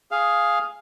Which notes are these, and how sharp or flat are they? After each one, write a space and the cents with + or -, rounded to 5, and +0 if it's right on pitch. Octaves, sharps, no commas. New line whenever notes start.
G#4 +0 F5 +0